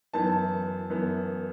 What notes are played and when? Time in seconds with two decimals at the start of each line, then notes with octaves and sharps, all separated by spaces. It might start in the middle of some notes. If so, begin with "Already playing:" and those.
0.13 F#2 E3 B3 A5
0.90 F#2 E3 B3